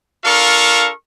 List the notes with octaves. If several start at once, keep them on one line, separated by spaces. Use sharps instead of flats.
D4 F4 A4 A#4 F5 C#6